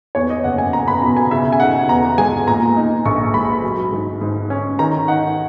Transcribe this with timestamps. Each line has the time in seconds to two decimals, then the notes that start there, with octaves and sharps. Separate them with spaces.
0.15 E2 C#5
0.30 D#5
0.44 F#1 F#5
0.58 G#5
0.73 F#1 A#5
0.88 B5
1.02 B2 A#5
1.17 G#5
1.31 C#3 E5
1.53 G#5
1.60 D#4 F#5
1.89 E2 A#5
2.18 G#3 G#5
2.48 A#2 A#5
2.76 D#4
3.05 A#1 C#6
3.34 G#3 B5
3.63 F#3
3.92 G#2
4.21 G#2
4.50 C#4
4.79 D#3 A#5
5.08 D#4 F#5